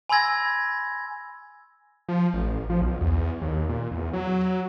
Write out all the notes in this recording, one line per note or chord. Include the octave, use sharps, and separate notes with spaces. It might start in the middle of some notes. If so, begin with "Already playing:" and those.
G#5 B5 C6 E6 G#6 A#6
F3
A1
F3
B1
E2
D#2
A#2
E2
F#3